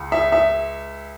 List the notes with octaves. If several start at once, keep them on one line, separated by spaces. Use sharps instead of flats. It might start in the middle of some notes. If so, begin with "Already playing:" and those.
Already playing: C#2
E5
E5